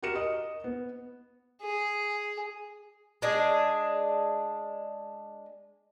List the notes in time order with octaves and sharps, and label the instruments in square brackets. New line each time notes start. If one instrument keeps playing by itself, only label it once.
[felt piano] F#4 G4 A#4 C#7 E7
D#5 D#6
B3
[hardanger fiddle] G#4
[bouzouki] G#3 D4 G#4